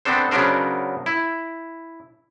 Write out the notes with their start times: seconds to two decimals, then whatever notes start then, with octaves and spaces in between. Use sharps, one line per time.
0.05 B3 C4 D4 A4 C5
0.31 C#3 F#3 B3 D4 A#4 C5
1.06 E4